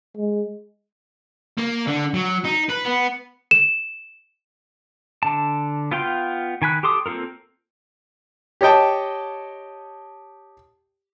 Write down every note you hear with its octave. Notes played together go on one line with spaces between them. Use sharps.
G#3
A#3
D3
F#3
D#4
B4
B3
E7
D3 A5
B3 F4 F5 G5 C6
D#3 G#5 B5 F#6
G4 A4 C6 D6 D#6
A#3 C4 F4 A4 A#4
G4 C#5 D#5 G5 A5